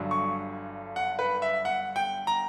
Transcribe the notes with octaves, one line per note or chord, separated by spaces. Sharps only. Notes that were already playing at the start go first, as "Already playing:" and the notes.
Already playing: G1 G2 D3 F#3
C#6
F#5
B4
E5
F#5
G5
A#5